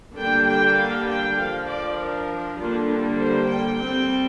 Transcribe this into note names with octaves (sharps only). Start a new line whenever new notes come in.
D3 G3 A#3 D4 G5
G5
F5
G5
F3 D4 F5
D5
A#4
D3 G3 A#3 D4 F4
D4
C5
G5
G3 C4 G5